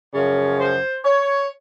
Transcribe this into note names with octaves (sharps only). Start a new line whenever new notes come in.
F#2 C#3 F3 C#5
C5
C#5